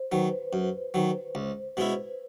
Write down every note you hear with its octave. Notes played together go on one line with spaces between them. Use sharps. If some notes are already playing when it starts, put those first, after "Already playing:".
Already playing: C5
D#3 F#3 B4
F#2
D#3 F#3
C#2 C5
B2 G#3 C#4 E4 B4